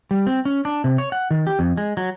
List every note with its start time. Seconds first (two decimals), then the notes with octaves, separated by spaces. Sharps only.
0.11 G3
0.27 C4
0.45 C#4
0.65 D4
0.84 C3
0.98 C#5
1.12 F#5
1.31 D#3
1.47 G4
1.59 F2
1.77 G#3
1.97 F#3